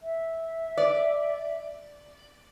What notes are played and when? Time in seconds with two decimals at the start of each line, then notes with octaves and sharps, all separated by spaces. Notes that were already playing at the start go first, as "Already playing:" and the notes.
0.02 E5
0.77 D5